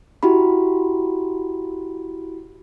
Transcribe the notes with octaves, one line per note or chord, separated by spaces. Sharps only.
E4 F#4 G4 B5